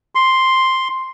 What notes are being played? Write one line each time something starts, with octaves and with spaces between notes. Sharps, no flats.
C6